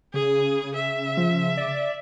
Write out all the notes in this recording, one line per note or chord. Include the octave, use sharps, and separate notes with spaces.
C#3 G#4
E5
F3
D5